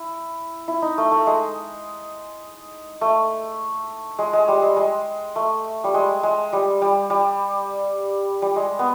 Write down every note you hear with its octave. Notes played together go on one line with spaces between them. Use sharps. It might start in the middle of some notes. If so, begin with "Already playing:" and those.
Already playing: E4
E4
D#4
A3
A3
G#3
A3
G#3
G#3
G3
G#3
G#3
A3
G3
G#3
G#3
G3
G3
G3
G3
G#3
B3